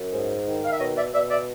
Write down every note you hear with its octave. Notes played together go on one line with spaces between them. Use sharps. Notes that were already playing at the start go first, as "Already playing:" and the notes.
Already playing: F#2
G#2
D#3
F5
E5
B2 C#5 D#5
D5 E5
B2 D5 E5
D5 E5